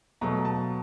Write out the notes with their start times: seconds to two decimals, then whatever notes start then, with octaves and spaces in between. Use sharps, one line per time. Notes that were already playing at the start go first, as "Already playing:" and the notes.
0.21 B2 F#3 A3 A#5
0.45 A5